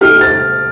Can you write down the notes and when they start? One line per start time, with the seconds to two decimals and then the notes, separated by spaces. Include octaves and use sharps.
0.01 A3 D#4 G4 F6
0.21 A6